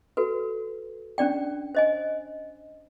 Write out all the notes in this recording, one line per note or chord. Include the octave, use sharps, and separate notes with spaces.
F#4 A4 B4
C#4 D4 D5 G5
C5 D#5 G#5